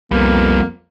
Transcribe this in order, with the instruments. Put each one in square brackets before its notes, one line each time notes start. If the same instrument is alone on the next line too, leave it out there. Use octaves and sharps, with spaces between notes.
[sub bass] C2 [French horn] F2 [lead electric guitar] G3 B3 [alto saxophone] A#3